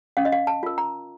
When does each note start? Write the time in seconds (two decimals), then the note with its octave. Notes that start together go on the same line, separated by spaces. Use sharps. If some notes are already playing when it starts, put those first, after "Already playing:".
0.17 C#4 F5
0.25 D#5
0.32 F5
0.47 A5
0.63 F4 A#4
0.78 A#5